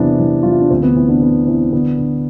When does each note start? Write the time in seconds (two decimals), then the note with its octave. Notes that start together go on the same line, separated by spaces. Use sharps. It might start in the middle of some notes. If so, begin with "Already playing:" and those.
Already playing: E2 C3 B3 D4
0.20 E2
0.43 E2 F4
0.51 E4
0.61 D4
0.70 D2 C4
0.83 B3
0.96 E3 C4
1.09 B3 D4
1.22 E3 B3
1.47 E3 C4
1.73 D3 B3 D4
1.98 D3